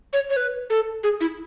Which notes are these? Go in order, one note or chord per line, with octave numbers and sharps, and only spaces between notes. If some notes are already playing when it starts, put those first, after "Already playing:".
C#5
C#5
B4
A4
G#4
E4